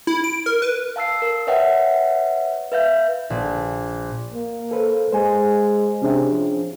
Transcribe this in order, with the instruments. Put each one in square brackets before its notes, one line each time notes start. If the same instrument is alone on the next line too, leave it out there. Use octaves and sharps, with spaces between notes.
[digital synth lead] E4
D7
A#4
B4
[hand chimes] F5 A5 E6 C7
A#4
B4 C#5 E5 F#5 G5
B4 E5 F5 G6
[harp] A#1
[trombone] A#3
[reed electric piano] A4 B4 C5
[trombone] G#3 [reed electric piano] C5 G#5
[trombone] C3 [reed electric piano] C#4 D4 G#4
[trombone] F3